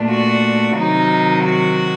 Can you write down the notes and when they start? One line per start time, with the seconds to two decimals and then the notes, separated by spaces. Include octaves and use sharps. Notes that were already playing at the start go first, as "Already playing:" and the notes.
Already playing: A#2 A3 D4
0.11 F#4
0.78 C3 D#3 F#3 D#4
1.45 F#4